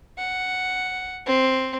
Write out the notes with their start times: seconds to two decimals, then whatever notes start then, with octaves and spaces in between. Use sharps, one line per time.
0.18 F#5
1.26 C4